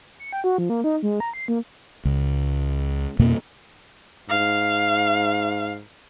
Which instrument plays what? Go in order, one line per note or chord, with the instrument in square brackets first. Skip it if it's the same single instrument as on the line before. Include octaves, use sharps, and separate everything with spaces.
[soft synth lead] C#7
G5
F#4
F3
A#3
D#4
G#3
A#5
C7
A#3
[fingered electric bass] C#2
F2 B2 A#3
[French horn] G#2 [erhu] F5